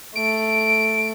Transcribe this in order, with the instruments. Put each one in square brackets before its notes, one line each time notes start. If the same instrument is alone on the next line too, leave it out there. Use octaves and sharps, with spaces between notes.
[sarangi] A3 [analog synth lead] D7